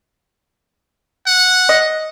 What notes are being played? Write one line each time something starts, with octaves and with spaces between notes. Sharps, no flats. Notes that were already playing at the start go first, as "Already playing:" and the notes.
F#5
D#5